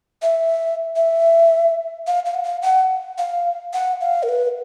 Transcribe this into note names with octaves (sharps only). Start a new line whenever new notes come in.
E5
E5
F5
F5
F#5
F5
F#5
F5
F#5
F5
A#4
B4